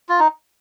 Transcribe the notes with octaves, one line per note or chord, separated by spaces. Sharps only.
F4
D#4